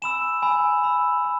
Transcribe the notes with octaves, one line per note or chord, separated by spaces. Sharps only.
G#5 B5 E6 E7
G#5 B5 E6
B5 E6
B5